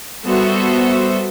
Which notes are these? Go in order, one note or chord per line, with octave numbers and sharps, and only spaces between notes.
G3 B3 F#4 A4 C5 E5